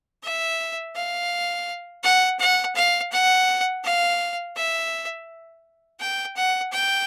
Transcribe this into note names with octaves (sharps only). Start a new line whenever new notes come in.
E5
F5
F#5
F#5
F5
F#5
F5
E5
G5
F#5
G5